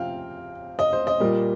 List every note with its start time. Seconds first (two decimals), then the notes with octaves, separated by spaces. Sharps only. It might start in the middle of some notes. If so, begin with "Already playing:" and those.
Already playing: C3 F3 C4 F5 G5
0.79 D#5
0.93 C5
1.07 D#5
1.20 A#2 G3 A#3